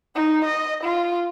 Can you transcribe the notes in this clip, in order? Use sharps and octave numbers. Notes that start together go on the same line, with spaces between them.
D#4
D#5
F4